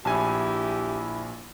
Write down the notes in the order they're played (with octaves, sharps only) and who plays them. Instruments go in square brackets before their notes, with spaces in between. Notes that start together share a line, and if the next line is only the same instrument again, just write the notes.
[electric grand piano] A#1 G#5 [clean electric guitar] E4 A5 [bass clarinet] G4